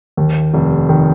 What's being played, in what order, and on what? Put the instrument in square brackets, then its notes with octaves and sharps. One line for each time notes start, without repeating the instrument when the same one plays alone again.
[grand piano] D#2
F1
D#3